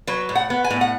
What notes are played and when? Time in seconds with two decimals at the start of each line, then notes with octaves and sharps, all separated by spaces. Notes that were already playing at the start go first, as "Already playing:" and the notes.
0.07 F#3 B4
0.29 A2
0.35 F#5
0.50 B3
0.64 G#5
0.70 A2
0.81 F#5